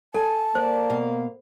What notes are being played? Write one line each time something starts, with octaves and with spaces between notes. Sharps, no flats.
A4 G#5 A5
A#3 C5 D5
B2 F5